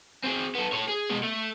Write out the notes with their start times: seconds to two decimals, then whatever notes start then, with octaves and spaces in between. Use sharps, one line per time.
0.24 C4 G#4
0.55 B3 A4
0.72 A4 C#5
0.88 G#4
1.10 B2 G#3
1.24 A3